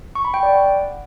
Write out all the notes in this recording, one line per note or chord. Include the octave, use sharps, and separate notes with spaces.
C#6
B5
G5
D5
F#5